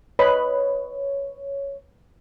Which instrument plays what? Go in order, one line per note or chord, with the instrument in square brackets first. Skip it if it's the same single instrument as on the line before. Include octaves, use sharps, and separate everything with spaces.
[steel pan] B4 D#5 B5 [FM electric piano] C#5